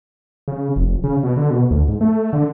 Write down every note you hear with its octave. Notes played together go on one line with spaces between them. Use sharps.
C#3
F1
C#3
B2
D3
B2
D2
G#2
A3
D3